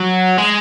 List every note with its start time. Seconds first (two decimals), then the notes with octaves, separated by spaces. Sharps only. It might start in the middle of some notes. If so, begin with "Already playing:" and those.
Already playing: F#3
0.38 G#3